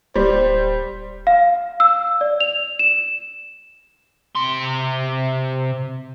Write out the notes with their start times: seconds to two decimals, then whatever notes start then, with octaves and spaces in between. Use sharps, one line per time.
0.16 D1 G3 C5
1.27 F5
1.80 E6
2.21 D5
2.40 F7
2.79 E7
4.36 C3 C6